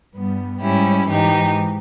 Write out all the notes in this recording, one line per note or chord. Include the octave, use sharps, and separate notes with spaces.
G2 G3 B3
G#2 G3 C#4 E4 G4
G#2 E3 G#3 D#4 G4